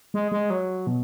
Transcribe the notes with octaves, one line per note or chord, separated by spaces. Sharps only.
G#3
G#3
F#3
B2